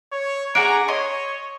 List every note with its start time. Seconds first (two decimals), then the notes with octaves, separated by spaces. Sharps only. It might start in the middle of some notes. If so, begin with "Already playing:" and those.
0.12 C#5
0.55 D4 F#4 G#4 A#5 D7
0.88 C#5 D#5 C6